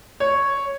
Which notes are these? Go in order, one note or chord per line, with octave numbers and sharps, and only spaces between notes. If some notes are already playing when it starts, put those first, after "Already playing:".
C#5